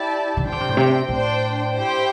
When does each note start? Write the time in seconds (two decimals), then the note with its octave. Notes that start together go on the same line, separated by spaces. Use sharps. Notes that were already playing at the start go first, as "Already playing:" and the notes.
Already playing: E4 G4 D5 A5
0.37 D3
0.44 E3 D4 C5 G5
0.52 D3
0.60 C3
0.69 A2
0.77 C3
1.08 A2 D4 C5 G5
1.73 E4 G4 C5 G5